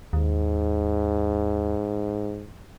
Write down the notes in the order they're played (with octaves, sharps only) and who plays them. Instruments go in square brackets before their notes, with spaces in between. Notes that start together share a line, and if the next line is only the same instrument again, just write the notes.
[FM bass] D#2 [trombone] G#2